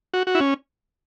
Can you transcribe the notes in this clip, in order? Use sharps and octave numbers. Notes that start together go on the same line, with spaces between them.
F#4
F#4
E4
C#4